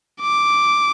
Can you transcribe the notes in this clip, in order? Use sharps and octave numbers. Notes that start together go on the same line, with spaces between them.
D6